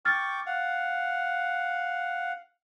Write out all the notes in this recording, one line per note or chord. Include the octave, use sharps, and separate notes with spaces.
G5 C#6 D6 F6 A6
F5 F#5